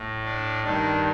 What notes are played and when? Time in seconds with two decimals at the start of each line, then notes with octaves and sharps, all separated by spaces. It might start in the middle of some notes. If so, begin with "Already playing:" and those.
Already playing: A2
0.25 D4
0.64 G2 D#3 D4